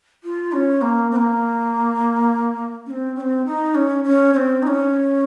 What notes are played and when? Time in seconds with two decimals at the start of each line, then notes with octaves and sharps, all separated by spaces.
0.24 F4
0.52 C#4
0.82 A#3
1.11 C4
1.16 A#3
2.86 C#4
2.91 C4
3.16 C#4
3.21 C4
3.46 D#4
3.75 C#4
4.04 C#4
4.33 C#4
4.36 C4
4.63 D#4
4.67 C#4